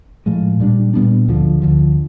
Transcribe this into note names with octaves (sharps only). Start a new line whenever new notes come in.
A2 F3 G#3
A#2 G3 B3 D4
A#2 G3 B3 D4
D2 D3 F3
D2 D3 F3